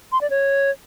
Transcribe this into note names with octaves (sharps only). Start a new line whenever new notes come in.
C6
D5
C#5